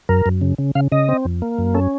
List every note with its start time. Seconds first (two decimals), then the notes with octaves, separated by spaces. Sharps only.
0.09 F#2 A#4
0.26 F#2
0.41 C#3
0.58 C#3
0.75 C#3 F5
0.92 C#3 D#5
1.09 C4
1.25 F2
1.42 A#3
1.58 F#2
1.75 C#4 A4